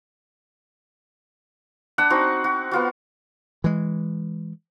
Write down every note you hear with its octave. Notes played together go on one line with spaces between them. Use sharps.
D4 F#5 B5 E6
C4 D#4 F#4
F#4
B3 F4 F#4
E3 G#3